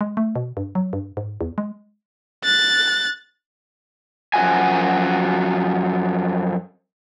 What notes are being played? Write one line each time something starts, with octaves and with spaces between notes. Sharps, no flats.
G#3
A3
B2
G2
F#3
G2
G#2
E2
G#3
F#6 A6
F#2 F3 F#4 G#5